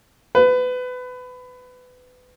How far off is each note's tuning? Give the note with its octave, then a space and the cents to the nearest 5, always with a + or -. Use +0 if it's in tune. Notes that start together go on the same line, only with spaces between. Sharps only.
B4 +25